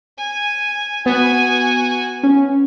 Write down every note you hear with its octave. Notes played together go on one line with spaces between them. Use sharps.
G#5
B3 F#4 G#5
C#4